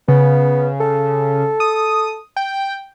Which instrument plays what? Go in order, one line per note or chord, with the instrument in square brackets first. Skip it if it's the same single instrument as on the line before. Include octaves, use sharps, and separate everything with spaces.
[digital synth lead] C#3 [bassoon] B3
[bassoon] A4
[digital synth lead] D#6
G5